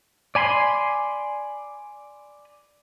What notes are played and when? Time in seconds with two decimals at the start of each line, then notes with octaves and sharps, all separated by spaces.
0.35 D5 G#5 B5 C6